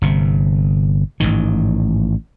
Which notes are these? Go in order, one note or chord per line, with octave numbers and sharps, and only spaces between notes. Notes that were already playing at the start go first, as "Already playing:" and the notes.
G1 C3
A1 G#2 D#3